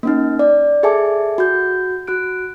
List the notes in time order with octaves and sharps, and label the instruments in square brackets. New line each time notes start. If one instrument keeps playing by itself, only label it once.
[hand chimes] A#3 C#4 D#4
D5
G#4 A4 E5 G#5 A5 D6
F#4 G6
F#4 F#6 D7